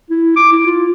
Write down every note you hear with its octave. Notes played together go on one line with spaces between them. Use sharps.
E4
D6
E4
F4